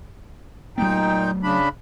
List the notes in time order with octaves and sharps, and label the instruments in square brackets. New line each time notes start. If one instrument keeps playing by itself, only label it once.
[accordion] A#2 D#4 G5 [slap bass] F#3 A3 B3
[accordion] C#3 D4 B5